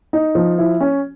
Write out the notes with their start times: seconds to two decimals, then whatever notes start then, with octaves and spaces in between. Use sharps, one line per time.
0.13 D#4
0.35 F3
0.58 E4
0.81 C#4